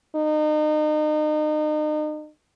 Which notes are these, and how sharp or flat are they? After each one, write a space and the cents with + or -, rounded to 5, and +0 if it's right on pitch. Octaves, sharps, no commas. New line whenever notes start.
D#4 -35